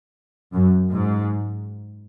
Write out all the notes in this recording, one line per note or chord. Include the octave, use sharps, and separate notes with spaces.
F#2
G#2